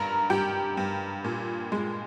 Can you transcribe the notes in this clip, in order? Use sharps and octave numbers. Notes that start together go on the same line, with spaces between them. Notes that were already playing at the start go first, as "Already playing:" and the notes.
Already playing: G2 A#4 A#5
G2 G4 G5
G2
A#2
G#3